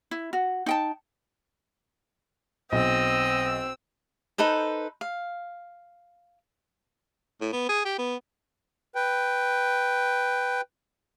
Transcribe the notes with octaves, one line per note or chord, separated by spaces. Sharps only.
E4
F#4
D#4 G5 A5
B1 C4 D#5 E6
D#4 A4 B4 C5
F5
A2
B3
G#4
G4
B3
B4 G5